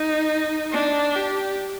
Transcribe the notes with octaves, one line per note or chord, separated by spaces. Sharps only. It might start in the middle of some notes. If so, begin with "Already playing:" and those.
Already playing: D#4
D4
G4